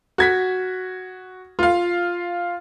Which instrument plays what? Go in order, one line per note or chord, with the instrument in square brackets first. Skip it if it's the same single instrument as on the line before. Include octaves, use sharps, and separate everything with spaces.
[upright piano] F#4 G#6 B6
F4 F5